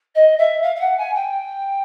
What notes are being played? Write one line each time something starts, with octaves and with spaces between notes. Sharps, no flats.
D#5
E5
F5
F5
F#5
G#5
G5